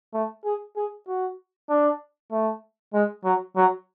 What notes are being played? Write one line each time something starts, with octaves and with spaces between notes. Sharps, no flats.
A3
G#4
G#4
F#4
D4
A3
G#3
F#3
F#3